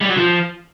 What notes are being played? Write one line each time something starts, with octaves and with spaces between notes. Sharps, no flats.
G3
F#3
F3